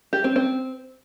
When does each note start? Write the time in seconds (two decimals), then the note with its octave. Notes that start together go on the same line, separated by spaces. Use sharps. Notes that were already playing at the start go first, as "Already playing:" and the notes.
0.13 G4
0.24 C4
0.36 C4